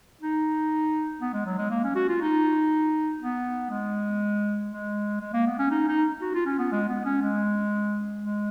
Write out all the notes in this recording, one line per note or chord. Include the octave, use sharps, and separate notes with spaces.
D#4
B3
G#3
F#3
G#3
A#3
C#4
F#4
F4
D#4
B3
G#3
G#3
G#3
A#3
B3
C#4
D#4
D#4
F#4
F4
C#4
B3
G#3
B3
C#4
G#3
G#3